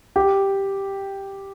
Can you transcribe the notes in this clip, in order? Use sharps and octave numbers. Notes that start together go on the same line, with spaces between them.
G4